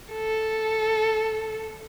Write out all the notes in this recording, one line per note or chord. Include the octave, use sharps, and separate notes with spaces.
A4